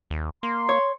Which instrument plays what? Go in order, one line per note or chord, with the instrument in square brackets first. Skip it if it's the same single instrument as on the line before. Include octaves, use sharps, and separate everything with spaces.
[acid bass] D#2
[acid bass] A#3 [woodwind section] C6
[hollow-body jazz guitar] C#5